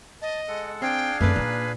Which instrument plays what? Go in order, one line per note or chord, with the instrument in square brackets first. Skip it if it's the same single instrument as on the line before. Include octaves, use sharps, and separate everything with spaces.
[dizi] D#5 [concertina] A5
[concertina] G#3 A4 F#5
[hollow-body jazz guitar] C4 [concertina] D4 G#4 F5 [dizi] G5
[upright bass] F#2 C4 [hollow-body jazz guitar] A3 D5 [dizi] B4
[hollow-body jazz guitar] A#2 [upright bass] A#3 D#4